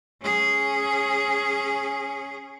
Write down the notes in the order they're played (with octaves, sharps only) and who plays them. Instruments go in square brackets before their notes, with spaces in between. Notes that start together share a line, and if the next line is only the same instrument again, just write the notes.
[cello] C#4 G#4